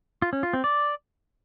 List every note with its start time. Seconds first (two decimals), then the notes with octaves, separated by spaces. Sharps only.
0.22 F4
0.33 C#4
0.43 F4
0.53 C4
0.64 D5